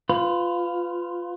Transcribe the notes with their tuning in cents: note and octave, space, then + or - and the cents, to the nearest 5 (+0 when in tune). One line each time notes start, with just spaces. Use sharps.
F4 +0 B4 +25